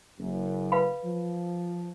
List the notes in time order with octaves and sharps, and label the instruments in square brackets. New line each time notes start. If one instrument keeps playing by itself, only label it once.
[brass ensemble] F#1 F#2
[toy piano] B4 F5 B5
[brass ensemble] F3